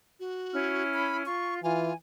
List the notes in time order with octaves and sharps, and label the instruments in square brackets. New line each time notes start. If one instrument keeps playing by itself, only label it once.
[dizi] F#4
[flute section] C#4 E4 F6
[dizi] B5
[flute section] F4 [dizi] C#6
[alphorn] E3 [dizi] F4 [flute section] G#5